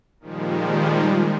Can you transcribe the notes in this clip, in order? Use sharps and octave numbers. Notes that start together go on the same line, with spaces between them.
A#2 D#3 F3 G3 G#3